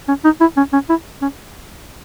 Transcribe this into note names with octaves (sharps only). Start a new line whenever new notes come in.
C#4
D#4
E4
C#4
C#4
E4
C#4